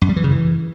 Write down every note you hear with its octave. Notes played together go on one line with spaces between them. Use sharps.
F#2
G3
E3
C#3
E3